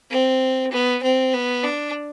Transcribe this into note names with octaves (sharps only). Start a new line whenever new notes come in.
C4
B3
C4
B3
D4